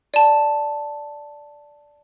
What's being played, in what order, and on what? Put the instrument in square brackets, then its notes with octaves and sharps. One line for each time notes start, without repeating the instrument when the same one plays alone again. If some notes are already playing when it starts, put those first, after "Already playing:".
[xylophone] D5 A5